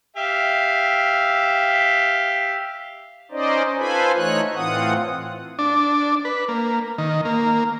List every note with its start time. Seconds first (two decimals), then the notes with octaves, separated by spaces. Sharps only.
0.16 G4 E5 F5
3.32 C#4 D#4 C5 D5 D#5
3.78 F4 A4 B4 C5 G#5 B5
4.16 E3 A3 D#4 C#5 F#6
4.55 A2 E3 C4 F4 F#5 D#6
5.59 D4
6.25 B4
6.49 A#3
6.98 D#3
7.25 A#3